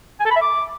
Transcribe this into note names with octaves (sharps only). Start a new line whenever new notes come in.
G#5
A4
B5
E5
D6